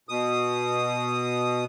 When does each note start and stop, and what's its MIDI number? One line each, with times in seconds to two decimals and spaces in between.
0.09 1.65 47
0.09 1.65 87